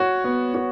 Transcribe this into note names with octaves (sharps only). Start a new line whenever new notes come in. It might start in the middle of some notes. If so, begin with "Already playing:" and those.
Already playing: F#4 C#5
B3
F#4